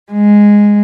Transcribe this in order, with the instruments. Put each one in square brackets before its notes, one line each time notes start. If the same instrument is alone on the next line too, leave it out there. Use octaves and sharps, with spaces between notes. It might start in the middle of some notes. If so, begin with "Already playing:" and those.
[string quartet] G#3